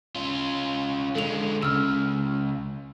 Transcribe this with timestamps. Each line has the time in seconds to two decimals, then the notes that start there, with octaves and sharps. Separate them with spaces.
0.15 C#4 F4
1.15 D3 G#3 A4 F7
1.63 C#2 C#3 E6 F6